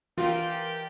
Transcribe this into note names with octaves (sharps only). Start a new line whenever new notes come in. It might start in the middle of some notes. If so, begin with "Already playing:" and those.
E3 F4 G4 A#4 D5 G5